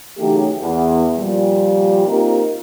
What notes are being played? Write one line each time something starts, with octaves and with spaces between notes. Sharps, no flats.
C#3 E3 F#3 A3 D#4 G4
E2
A#2 F3 G3
A#3 C4 D#4 F4 G4 A#4